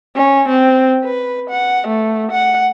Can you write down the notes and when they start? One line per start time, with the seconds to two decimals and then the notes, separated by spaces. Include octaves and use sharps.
0.16 C#4
0.48 C4
1.05 B4
1.50 F#5
1.87 A3
2.31 F#5